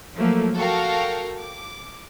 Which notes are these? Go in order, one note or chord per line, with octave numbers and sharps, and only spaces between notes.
F3 F#3 A3 A#3
F#4 A4 A#4 F5 G5 C#6
D6